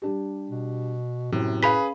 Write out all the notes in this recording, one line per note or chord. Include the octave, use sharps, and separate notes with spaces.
G3 D4 G4
B2
F#2 A2 C3
C#4 G#4 B4 F5 B5 B6